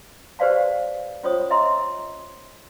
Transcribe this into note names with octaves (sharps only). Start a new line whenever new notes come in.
G4 B4 C5 D5 F5 A5
C#4 F4 C5 C#5 D#6
D#5 E5 A#5 C6 E6